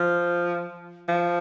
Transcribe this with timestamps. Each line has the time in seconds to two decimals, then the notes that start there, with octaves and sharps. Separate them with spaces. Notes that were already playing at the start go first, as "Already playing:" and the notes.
Already playing: F3
1.09 F3